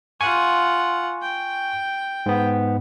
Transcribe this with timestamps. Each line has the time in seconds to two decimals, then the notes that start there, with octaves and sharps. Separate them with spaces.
0.21 F4 F#5 G#5 C#6
1.22 G5
2.26 G#2 B3